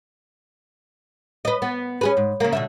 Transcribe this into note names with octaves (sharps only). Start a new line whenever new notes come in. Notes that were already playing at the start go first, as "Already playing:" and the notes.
B4 D#5
B3
C#4 G#4 B4
G#2
C#3 A#3
B2 D3 E5